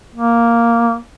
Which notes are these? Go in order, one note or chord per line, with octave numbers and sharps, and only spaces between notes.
A#3